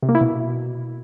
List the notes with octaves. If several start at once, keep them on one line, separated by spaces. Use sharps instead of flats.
C3
A#3
E4
B2